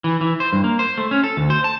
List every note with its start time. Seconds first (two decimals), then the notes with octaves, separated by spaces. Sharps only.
0.04 E3
0.21 E3
0.40 C5
0.53 G2
0.64 A#3
0.79 C5
0.97 A3
1.11 C#4
1.24 A4
1.37 D2
1.50 C5
1.64 A5